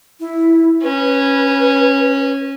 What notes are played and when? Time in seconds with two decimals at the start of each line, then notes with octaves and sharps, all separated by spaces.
0.20 E4
0.83 C#4 B4